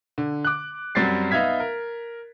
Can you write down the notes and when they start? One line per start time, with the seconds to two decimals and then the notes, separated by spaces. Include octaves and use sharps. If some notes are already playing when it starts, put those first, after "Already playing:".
0.18 D3
0.45 D6 F#6
0.95 F#2 F#3 G3 C4 A6 C7
1.31 B3 D#4 E5 F5 G#6 B6
1.60 A#4